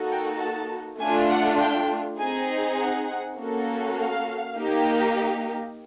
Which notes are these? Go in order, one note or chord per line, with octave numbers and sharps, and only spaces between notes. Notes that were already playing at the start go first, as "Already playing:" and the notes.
Already playing: A#3 D#4 F#4 A4
G5
A5
A3 D4 F4 G#5
F#5
G5
C4 D#4 G#4 G#5
F#5
A#3 C#4 F#4 A4
F5
A#3 D#4 G4